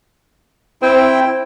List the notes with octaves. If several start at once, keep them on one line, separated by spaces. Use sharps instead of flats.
C4 E4 G5